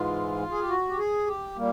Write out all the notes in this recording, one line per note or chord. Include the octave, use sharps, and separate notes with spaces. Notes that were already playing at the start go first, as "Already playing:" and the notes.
Already playing: G#2 E3 G#3 F4
G#4
G4
F#4
G4
G#4
G4
A#2 G3 A#3